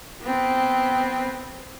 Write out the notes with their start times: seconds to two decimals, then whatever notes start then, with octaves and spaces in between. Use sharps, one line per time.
0.22 B3 C4